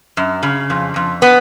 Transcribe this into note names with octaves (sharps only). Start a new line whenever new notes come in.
F#2
C#3
F2
F2
B3